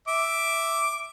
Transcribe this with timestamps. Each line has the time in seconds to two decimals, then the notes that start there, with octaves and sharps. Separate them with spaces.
0.08 E5 D6